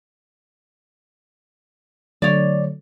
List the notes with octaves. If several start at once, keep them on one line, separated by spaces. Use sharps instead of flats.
D3 F#3 A3 C#5 D5